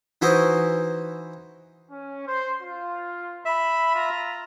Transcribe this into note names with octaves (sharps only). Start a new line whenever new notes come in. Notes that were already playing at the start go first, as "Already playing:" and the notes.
E3 D#4 E4 F#4 C5 D#5
C#4
C5 C6
F4
E5 B5
F4 A#5